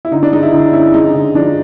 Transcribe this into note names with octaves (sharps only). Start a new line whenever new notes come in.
E4
D3 D#4
D4
G#3 D#4
E4
D3 D#4
C#4 E4
G#3 D#4
D3
F3 D4